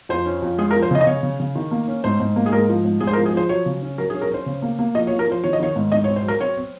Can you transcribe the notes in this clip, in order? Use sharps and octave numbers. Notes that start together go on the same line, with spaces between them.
F2 C5
C#4
F2
G#3 G#4
A#4
F3
C5
C#3 D#5
D#5
C#3 C#5
C#3
C#3
D#3
A#3
C#4
G#2 C5
G#2
A#3
G#4
G#2 A#4
F3
G#2
G#2 G#4
C5
A#4
F3
G#4
F3 C5
F#3 C#5
C#3
C#4
F#3 A#4
G#4
C#4
A#4
C#4 C5
C#3
A#3
A#3
F3 D#5
C#5
F3
A#4
F3 C5
D#3 C#5
D#5
D#3 C#5
G#2
G#2 D#5
C#5
C4
C5
F#3 A#4
C4 C#5
C4